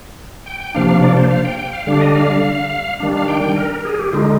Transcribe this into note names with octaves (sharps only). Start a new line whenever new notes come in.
G5
G5
C3 F3 A#3 D4 F5
F5
D5
C5
F5
G5
G5
F5
D3 G3 D4 F5
D5
D#5
F5
D#3 G3 D4
F5
G5
G5
A#4
G#4
G4
D3 G#3 D#4 F4